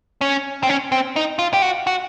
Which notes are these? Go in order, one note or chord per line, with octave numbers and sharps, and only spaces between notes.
C#4
C4
C#4
C4
D#4
F4
G4
F#4
F#4